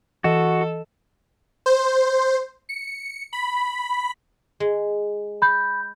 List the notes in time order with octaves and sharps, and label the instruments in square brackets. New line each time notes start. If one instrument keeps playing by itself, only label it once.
[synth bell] E3 D#5 E7 [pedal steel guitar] F#4 [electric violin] A4
[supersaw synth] C5
C#7
B5
[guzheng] G#3
[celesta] B5 G6